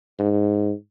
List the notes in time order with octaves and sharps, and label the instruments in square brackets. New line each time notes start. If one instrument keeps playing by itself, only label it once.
[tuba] G#2